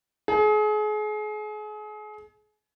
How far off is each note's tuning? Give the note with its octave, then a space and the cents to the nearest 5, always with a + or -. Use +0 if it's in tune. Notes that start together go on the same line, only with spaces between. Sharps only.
G#4 +35